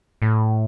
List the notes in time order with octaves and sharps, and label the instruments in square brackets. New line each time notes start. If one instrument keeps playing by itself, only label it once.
[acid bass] A2